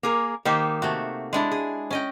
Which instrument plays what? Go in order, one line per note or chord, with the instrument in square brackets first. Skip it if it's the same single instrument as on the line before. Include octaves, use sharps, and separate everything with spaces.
[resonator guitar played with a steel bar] A#3 G#4 A#4
[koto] D#3 D#4 C5 [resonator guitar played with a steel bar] A#3 G4
[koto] C3 A3 F#4
G#3 D4 E4
[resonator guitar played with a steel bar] G#4
[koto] C#4 D#5 G5